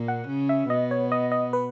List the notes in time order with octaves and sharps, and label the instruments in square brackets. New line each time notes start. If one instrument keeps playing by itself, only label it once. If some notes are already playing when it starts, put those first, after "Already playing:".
Already playing: [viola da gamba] A#2 A#3
[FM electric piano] F#5
[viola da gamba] C#3 C#4
[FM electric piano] E5
[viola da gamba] B2 B3 [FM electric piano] D#5
[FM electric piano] C#5
D#5
D#5
B4